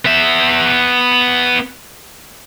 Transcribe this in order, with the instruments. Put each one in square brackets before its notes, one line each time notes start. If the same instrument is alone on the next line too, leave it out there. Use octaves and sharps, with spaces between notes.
[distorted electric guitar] B3 E5